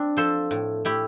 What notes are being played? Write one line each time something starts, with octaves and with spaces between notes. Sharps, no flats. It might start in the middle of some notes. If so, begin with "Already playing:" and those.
Already playing: C4 D4
F3 A4 C5
A2
A2 E4 G4